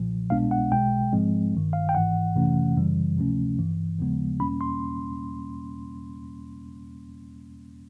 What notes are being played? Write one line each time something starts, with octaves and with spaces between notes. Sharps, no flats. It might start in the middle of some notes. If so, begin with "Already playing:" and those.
Already playing: B1 A#2 F3
C2 B2 G#3 B3 D4 F5
F#5
B1 B2 G#3 G5
G#2 F3 G#3 C4
G1 G2 D#3
F5
G5
G#1 G#2 E3 F#5
F2 C3 E3 A3 C#4
F#2 C#3 E3 G3
D2 C3 F3 A3 C#4
G#1 G2 E3
D#2 C#3 F3 G#3 B3
E2 B2 G3 A#3 C#4 B5
C6